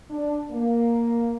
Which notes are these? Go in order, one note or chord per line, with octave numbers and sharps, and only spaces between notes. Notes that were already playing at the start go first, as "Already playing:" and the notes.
D4
A#3